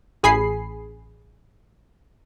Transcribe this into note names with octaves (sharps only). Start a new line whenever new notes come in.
A1 G#4 G#5 B5 C7